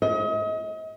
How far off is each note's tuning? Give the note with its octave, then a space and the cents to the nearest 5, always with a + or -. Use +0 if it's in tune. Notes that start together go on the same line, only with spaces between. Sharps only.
D#5 +35